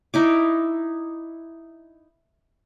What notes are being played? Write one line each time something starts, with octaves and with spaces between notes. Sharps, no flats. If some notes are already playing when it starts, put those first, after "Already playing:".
D#4 E4 D6